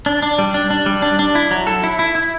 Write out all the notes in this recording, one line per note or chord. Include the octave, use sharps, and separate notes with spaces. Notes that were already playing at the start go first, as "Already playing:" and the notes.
D4
D4
G3
D4
D4
G3
D4
D4
E4
F#3
A4
E4
E4
E4